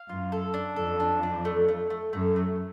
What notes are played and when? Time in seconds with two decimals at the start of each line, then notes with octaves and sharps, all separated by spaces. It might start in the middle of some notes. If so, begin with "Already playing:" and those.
Already playing: F5
0.09 F#2 F4
0.32 A4
0.54 D4
0.76 F2 A4
1.00 D4
1.23 D4
1.45 A3
1.68 A3
1.90 A3
2.13 F#2 A3
2.36 A3